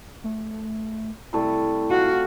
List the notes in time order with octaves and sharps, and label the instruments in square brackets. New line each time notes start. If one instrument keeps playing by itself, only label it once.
[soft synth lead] A3
[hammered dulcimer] C3 G3 A3 [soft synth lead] E4
[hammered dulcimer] F4 F5 F#5 [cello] F#4